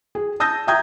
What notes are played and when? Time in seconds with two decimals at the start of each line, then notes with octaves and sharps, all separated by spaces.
0.15 G#4
0.40 A5 D#6 E6 G6 A#6
0.67 E5 G5 A#5 D#6 G6 G#6